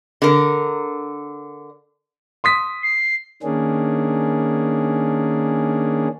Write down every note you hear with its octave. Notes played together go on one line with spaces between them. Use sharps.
D3 A#4
C6 D#6 B6
C7
D#3 A#3 C#4 D4 G#4